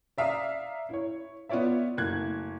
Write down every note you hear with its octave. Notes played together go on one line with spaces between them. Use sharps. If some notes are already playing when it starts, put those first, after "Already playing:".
D5 E5 F5 A#5 D#6
E4 C#5
B3 F4 C#5 D5 E5
F#1 A3 F#6 G#6